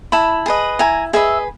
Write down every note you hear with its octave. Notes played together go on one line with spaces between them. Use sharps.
E4 A5 B5
G#4 B4 D#5
E4 G#5 A#5
G#4 B4 D#5 E5